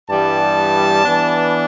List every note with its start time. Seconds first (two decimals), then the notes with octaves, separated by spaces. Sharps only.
0.09 G2 E3 G3 B3 A5
1.03 E3 B3 D4